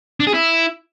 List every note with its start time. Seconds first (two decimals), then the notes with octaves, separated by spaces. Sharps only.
0.20 D4
0.27 G#4
0.34 E4